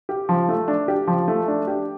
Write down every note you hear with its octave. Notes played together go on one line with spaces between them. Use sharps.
G4
F3
A3
D4
G4
F3
A3
D4
G4